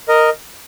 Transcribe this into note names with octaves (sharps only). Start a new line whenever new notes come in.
A#4 D#5